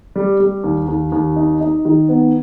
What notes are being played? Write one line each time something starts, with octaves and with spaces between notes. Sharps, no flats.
G3
G3
D#2
D#2
D#2
D#4
D#4
D#3
B3